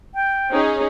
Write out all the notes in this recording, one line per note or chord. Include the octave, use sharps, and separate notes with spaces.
G5
C#4 D#4 G#4